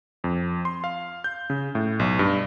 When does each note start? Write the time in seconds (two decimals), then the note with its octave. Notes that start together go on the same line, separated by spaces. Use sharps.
0.24 F2
0.65 C6
0.84 F5
1.24 G6
1.50 C#3
1.75 A2
1.99 B1
2.19 G2